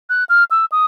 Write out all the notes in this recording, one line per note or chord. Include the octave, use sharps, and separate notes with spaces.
F#6
F6
E6
D#6